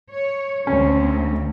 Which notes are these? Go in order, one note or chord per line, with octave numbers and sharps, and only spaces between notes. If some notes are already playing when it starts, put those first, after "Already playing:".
C#5
D2 C4 C#4